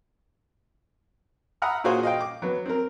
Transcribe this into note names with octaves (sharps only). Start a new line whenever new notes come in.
E5 F#5 A#5 B5 D#6 F6
A#2 F4 F#4 G#4 C5 G#5
D#5 F5 G5
D6
F#3 B3
C4 A#4